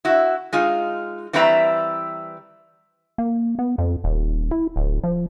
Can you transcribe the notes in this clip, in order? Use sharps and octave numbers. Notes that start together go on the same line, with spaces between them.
E4 F#4
G#3 D#4 F4
E3 G3 C4 B4 E5 A#5
A#3
B3
F2
D#1
E4
D1
F3